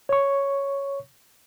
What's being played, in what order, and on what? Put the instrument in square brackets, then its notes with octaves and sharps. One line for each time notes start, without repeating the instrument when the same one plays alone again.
[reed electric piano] C#5 C#6